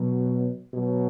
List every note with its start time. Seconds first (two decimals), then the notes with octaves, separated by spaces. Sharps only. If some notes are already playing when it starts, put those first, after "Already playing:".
Already playing: B2 F#3
0.73 B2 F#3